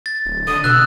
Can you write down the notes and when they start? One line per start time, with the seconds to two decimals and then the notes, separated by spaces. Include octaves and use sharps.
0.06 A6
0.26 D1
0.47 D3 D#6
0.64 B2 E6 F#6